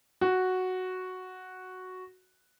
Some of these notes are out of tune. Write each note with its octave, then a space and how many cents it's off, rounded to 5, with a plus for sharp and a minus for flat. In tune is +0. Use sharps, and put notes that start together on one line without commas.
F#4 +0